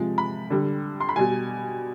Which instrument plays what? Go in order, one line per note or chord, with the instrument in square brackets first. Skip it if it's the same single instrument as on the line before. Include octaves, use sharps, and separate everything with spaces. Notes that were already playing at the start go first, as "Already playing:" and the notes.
Already playing: [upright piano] C3 F3 G#3
B5
D3 G3
C6
B5
B2 G3 G#5